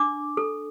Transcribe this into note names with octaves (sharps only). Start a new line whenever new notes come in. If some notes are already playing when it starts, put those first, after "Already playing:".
Already playing: D4 D6
A4